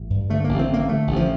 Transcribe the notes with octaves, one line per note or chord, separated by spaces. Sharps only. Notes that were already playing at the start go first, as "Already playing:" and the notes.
Already playing: A1
G2
D3 A3
A1 A#3
C4
D3 A#3
D3 A3
A1
F3